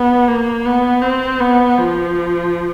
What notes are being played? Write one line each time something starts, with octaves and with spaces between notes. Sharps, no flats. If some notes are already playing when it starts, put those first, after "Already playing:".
Already playing: B3
A#3
B3
C4
B3
F3